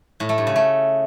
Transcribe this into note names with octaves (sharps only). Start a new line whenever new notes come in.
A2
A3
G2
C#3
A3